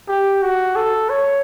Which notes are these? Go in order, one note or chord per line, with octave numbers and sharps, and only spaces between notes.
G4
F#4
A4
C#5